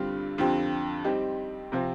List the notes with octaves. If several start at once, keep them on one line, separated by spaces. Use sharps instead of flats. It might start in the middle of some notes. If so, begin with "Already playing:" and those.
Already playing: G2 D3 G3 C4 F4
F2 D3 F3 C4 G4
G3 C4 D#4 G4
C3 F3 C4